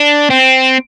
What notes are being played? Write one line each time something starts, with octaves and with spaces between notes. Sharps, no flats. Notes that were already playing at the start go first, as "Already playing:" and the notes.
Already playing: D4
C4